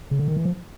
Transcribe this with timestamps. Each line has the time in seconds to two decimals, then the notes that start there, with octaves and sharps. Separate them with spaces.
0.11 C#3
0.19 D3
0.28 D#3
0.36 E3
0.45 F3